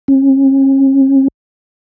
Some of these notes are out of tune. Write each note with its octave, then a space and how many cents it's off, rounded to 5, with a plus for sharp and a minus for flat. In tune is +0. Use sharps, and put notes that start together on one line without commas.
C#4 -40